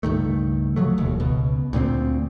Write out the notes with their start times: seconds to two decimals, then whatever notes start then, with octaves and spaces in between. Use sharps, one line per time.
0.03 C#2 G2 D#3 A3
0.76 C3 F3 F#3 A3
0.98 E1 D#2
1.20 C#2 B2
1.73 D2 A#2 B3 C4